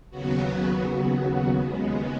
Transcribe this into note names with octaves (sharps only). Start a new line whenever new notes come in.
D#2 C#3 F#3 B3 F#4
D#2 C#3 G#3 B3